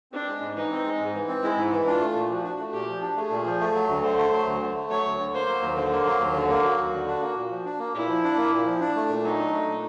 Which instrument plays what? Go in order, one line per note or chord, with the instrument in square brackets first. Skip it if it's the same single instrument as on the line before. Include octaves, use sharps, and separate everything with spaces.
[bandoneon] C4 [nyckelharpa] D4
[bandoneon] G#3
G#2
[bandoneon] E3 [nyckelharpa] D#4
[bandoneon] C4
G#3
G#2
E3
C4
[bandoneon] G#3 [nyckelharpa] E4
[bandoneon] G#2
E3
[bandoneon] D4 [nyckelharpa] F4
[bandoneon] A3
A#2
[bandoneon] F3 [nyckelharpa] F#4
[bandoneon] D4
A3
[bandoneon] A#2 [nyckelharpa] G4
[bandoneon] F3
D4
[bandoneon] A3 [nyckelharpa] G#4
[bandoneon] A#2
F3
A3
F#3
D2
[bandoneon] D3 [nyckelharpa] C5
[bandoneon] A3
F#3
D2
D3
A3
[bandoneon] F#3 [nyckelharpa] C#5
[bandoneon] D2
D3
[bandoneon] A#3 [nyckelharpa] C5
[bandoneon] F#3
D#2
[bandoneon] D3 [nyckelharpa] C5
[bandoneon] A#3
F#3
D#2
D3
A#3
[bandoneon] F#3 [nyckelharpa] F#4
[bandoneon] D#2
D3
D4
A#3
A#2
F3
D4
A#3
[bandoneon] A#2 [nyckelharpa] E4
[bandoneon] F3
D4
A#3
A#2
F3
D4
A3
A#2
[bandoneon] F#3 [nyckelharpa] D#4
[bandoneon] D4
A3
A#2